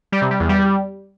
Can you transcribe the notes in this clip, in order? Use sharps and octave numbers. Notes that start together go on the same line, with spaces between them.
G3
C3
G3
E2
G3